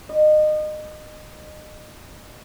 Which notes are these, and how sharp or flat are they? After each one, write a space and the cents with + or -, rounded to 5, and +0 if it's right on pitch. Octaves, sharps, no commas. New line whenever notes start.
D#5 -30